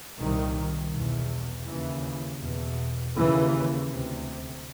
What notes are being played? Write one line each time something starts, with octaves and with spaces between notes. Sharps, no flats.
C2 A#2 D#3
E2 B2
D#2 C#3 E3
E2 B2
D#2 C#3 E3
D2 C3